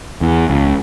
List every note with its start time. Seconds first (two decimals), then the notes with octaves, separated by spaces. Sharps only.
0.21 E2
0.50 C#2